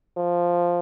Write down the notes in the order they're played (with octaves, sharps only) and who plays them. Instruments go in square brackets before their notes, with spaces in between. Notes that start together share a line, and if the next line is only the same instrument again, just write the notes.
[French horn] F3